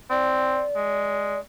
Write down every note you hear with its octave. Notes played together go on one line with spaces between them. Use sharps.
C4 D5
G#3